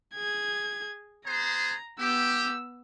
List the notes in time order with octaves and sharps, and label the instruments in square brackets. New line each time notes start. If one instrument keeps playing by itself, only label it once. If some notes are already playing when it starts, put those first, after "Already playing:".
[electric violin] G#4 G#6
[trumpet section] B3 G#4 C5 [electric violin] A#5
[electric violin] B3 E6 [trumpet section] G4